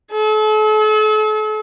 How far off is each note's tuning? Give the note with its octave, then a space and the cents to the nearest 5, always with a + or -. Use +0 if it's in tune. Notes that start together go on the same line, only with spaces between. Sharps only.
A4 -40